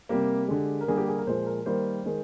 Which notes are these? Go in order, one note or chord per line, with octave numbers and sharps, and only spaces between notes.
C3 G3 A#3 G4
D3 G#3
A#4
D3 G3 A#3 G#4
G4
G#4
A#4
A#2 F3 G#3 C5
A#4
D#3 G3 A#3 C5
D#3 G#3